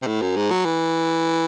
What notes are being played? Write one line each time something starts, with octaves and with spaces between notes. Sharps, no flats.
C3
A2
F#2
G#2
F#3
E3